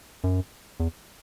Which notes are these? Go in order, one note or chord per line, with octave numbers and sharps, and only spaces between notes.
F#2
E2